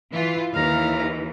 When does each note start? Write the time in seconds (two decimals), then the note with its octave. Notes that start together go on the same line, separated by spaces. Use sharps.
0.12 E3 F4
0.53 D#2 E3 F5 A#5